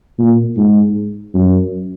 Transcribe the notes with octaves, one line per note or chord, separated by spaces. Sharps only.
A#2
G#2
F#2